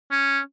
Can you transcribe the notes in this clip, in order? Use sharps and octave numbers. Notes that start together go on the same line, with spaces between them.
C#4